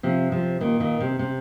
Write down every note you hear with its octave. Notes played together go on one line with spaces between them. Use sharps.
C3 F3
C3 F3
A#2 D#3
A#2 D#3
C3
C3